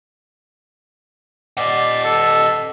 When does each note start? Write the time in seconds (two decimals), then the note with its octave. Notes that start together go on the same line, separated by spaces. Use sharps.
1.57 D5 D#5 F#5
2.04 A4